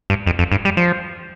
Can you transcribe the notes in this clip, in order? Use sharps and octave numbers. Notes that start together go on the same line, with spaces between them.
G2
F2
F2
G2
G3
F3